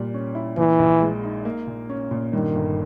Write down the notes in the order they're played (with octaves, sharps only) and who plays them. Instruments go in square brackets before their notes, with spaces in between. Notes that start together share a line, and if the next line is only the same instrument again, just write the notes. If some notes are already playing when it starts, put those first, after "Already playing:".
Already playing: [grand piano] A#2 G3
C#4
E4
[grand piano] A#2 [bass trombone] E3
[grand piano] A#1
G#3
D#4
A#3
A#2
C#4
A#2
[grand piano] G2 [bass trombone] D#3
[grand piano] G1